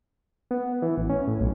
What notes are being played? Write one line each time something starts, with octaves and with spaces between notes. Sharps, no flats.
B3
E3
A1
C#4
A2
B1